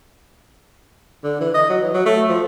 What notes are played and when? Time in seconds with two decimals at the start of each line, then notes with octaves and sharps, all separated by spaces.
1.23 D3
1.41 E3
1.54 D#5
1.70 F#3
1.82 E3
1.94 F#3
2.06 A3
2.29 F3